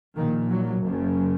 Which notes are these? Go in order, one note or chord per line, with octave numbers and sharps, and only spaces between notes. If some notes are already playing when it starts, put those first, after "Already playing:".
A#1 A#2 D#3
F#3
F#1 F#2 C#3